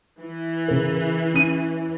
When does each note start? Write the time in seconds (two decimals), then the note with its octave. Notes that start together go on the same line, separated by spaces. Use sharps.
0.19 E3
0.68 C#3 A#4
1.34 C#4 D#7